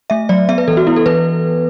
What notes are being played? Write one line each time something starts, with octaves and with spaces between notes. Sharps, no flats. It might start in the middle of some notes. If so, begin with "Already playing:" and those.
A3 E5
F#3 D5
B3 E5
B4
E3 A4
F#4
B3 E4
A4
E3 B4